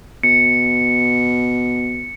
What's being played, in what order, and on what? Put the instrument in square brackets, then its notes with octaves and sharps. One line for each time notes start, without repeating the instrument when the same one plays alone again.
[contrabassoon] B2 [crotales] C#7